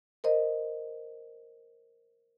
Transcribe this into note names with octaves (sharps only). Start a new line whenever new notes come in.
A#4 C5 D#5